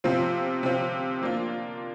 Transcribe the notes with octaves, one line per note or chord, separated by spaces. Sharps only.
C3 F3 C4 F4
C3 F3 C4 F4
F3 A#3 D4 F4